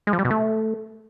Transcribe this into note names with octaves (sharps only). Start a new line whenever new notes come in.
G#3
F3
G3
B2
A3